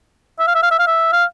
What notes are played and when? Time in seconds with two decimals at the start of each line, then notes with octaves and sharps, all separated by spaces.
0.39 E5
0.47 F5
0.55 E5
0.63 F5
0.71 E5
0.79 F5
0.87 E5
1.13 F5